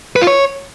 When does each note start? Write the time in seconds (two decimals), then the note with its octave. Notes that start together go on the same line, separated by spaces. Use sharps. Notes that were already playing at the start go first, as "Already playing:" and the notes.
0.16 B4
0.22 F4
0.27 C#5